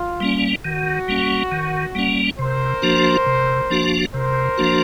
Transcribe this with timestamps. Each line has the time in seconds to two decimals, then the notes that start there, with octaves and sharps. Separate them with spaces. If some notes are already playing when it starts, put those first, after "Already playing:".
Already playing: F4
0.21 G3 A#3 C#4
0.65 D#3 F#4
1.08 G3 A#3 C#4
1.52 D#3
1.95 G3 A#3 C#4
2.38 C3 A#4 C5
2.82 F3 A#3 D4 F#4
3.26 C3
3.70 F3 A#3 D4 F#4
4.14 C3 A#4 C5
4.58 F3 A#3 D4 F#4